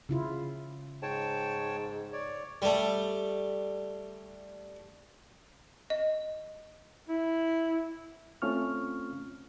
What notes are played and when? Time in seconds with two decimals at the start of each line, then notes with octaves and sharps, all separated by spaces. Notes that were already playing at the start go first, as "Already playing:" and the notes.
0.09 C#3 E4 F4
1.02 G#2 C#5 G5 A5
2.13 C#5 D5
2.62 G3 A3
5.90 D#5
7.09 E4
8.42 A3 C4 C#4 F4 C#6 F6